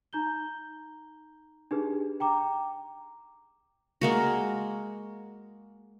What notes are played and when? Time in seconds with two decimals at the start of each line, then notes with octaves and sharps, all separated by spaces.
0.13 D#4 A#5 G6 G7
1.71 D4 D#4 G4 G#4 B4
2.20 G5 A#5 D6
4.01 G#3 A#3 F#4